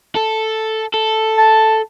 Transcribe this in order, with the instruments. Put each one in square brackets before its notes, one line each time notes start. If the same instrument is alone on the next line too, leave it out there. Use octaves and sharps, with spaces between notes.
[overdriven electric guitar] A4
A4
[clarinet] A5